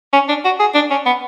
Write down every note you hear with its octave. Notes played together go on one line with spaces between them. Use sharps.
C#4
D4
F#4
G#4
D4
C#4
B3